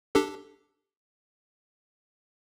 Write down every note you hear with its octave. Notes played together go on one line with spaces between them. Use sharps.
D4 G4 A4